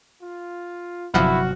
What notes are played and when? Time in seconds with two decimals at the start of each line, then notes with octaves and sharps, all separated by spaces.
0.21 F4
1.14 G1 C3 F3 F#3 E4 F#4 F#5 F6